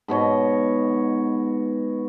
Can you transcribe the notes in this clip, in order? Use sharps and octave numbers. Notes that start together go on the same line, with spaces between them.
G#2 B2 C#5 D#5